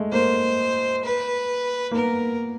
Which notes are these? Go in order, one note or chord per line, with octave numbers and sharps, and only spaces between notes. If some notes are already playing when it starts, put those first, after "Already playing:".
Already playing: G#3 A3
A#3 C5
B4
A#3
B3 A#4